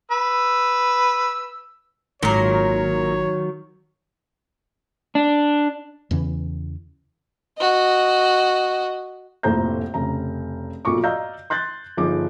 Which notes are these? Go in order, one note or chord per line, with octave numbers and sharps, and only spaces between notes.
B4 E6
G#1 A#2 D#3 F#3 A#4 C#5
D4
E2 C#3 E3 C#4
F#4 D#5
F1 A#1 A2 C5 A#5 G6
F1 C#3 A#5
B1 A#2 F4 C#6 D6
D5 D#5 F5 A#5 E6 G6
C6 F#6 G6 A6
G1 F3 D#4 G#4 D6